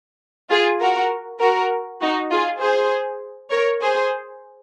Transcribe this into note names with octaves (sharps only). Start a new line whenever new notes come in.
F4 G#4
F#4 A#4
F#4 A#4
D#4 F#4
F4 G#4
G#4 C5
A#4 C#5
G#4 C5